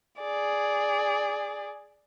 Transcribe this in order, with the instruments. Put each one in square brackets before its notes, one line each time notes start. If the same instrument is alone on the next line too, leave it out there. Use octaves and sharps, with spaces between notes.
[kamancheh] G#4 D5